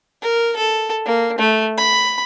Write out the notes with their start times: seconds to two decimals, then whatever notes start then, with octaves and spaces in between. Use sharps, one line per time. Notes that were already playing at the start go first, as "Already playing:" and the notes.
0.22 A#4
0.56 A4
1.05 A#3
1.38 A3
1.77 B5